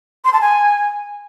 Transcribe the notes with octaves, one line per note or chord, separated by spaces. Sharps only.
C6
A5
G#5